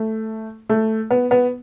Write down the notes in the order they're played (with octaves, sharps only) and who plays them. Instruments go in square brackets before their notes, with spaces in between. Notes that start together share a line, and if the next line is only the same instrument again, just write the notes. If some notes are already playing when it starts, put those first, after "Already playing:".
Already playing: [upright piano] A3
A3
B3
B3